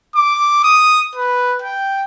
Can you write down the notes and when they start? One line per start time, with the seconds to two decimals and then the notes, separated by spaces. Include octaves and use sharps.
0.16 D6
0.64 D#6
1.15 B4
1.62 G5